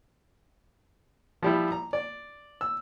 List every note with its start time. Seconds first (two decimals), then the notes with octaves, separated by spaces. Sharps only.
1.43 F3 G3 E4
1.72 A#5
1.93 D5
2.61 E6